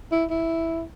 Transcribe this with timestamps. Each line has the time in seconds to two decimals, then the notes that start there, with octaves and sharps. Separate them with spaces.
0.12 E4
0.30 E4